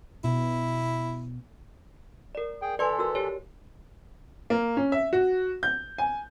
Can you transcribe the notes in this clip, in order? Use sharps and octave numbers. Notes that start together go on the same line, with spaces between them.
B2 E4
A#4 D5
G#4 G5
E3 A4 B4 D5 G#5 C6
F#4 A#4 E6
G4 C#5
A#3
C#4
E5
F#4
G6
G#5